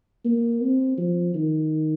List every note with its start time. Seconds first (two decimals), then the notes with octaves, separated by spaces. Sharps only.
0.25 A#3
0.61 C4
0.98 F3
1.34 D#3